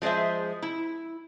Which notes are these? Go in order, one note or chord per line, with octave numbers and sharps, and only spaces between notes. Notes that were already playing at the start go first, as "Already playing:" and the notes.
F3 G#3 G#4 C5 E5
E4